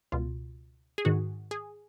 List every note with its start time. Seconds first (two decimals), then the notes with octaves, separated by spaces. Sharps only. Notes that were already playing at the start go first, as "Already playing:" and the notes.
0.12 C#2 B2 F4
0.98 G#4
1.05 G#2 D#3 F#4
1.51 G#4